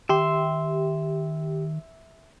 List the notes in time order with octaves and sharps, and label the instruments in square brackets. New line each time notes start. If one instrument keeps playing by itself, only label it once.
[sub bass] D#3 [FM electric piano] G4 [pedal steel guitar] E5 C6